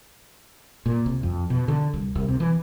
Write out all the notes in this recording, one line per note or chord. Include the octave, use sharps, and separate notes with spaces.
A#2
C2
F2
B2
D3
C2
C2
C3
E3